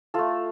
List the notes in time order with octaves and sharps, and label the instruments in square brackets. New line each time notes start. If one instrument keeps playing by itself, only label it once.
[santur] A3 F4 A4